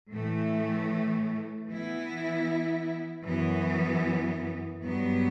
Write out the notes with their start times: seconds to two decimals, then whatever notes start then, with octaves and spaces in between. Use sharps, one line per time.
0.11 A2 E3 A3
1.68 E3 B3 E4
3.25 F#2 E3 B3
4.81 G2 F#3 B3